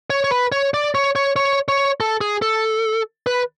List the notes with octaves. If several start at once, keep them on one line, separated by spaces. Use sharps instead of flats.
C#5
C#5
B4
C#5
D5
C#5
C#5
C#5
C#5
A4
G#4
A4
B4